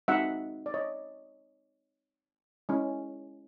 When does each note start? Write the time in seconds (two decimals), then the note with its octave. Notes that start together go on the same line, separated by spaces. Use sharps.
0.08 G#3 C4 D#4 F#4 E5 F#5
0.66 D5
0.74 C#5 D#5
2.69 G#3 C#4 E4